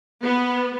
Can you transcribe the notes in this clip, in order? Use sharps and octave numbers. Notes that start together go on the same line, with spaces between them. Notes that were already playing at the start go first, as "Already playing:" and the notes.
B3